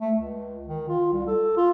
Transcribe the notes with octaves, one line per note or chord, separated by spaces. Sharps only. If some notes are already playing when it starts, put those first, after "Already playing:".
A3
C#2
D#3
F4
C2
A4
F4